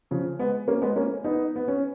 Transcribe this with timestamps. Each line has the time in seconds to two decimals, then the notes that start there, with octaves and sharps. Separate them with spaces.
0.11 C#3 F3
0.39 G#3 B3
0.68 A#3 C#4
0.82 G#3 B3
0.96 A#3 C#4
1.24 B3 D#4
1.56 B3
1.68 C#4